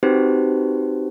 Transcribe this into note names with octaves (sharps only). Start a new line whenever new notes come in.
C4 D#4 F#4 G4 B4 C5